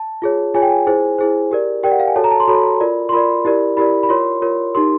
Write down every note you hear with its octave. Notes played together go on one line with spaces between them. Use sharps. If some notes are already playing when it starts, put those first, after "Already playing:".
Already playing: A5
F4 G#4 C#5
F4 G#4 C#5 G#5
G5
G#5
E4 G#4 C5
E4 G#4 C5
G4 A#4 D5
G4 A#4 D5 G5
F#5
F5
G#5
F#4 A4 C#5 A5
A#5
A5
C6
F#4 A4 C#5 B5
F4 A#4 D5
C6
F4 A#4 D5 B5
E4 G4 A#4 D5
E4 G4 A#4 D5 B5
B5
F4 A#4 C#5 C6
F4 A#4 C#5
D#4 G4 A#4 C6